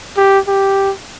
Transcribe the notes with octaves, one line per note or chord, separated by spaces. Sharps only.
G4
G4